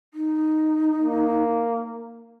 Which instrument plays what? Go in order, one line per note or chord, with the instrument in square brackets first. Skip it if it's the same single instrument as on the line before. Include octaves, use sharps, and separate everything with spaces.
[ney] D#4
[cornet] A#3